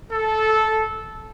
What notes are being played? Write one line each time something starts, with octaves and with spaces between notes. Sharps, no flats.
A4